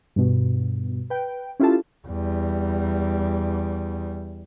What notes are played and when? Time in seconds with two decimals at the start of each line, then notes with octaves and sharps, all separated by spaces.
0.16 G2 B2
1.10 B4 G5
1.60 C#4 E4 F4 G4 A4 A5
2.07 E2 G3